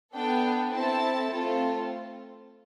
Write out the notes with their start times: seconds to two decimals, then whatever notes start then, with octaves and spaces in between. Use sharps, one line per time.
0.12 B3 D4 A4 G5
0.72 C4 E4 A4 A5
1.30 A3 C4 F4 A4